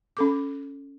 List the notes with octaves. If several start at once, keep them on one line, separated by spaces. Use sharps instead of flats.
C#4 A4 D6